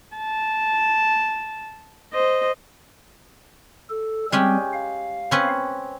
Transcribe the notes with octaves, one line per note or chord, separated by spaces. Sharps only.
A5
C5 D#5
A4
G3 G#3 C4 C#4 G4
F5
C4 C#4 B4